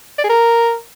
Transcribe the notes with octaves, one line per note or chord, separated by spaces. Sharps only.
D5
G#4
A#4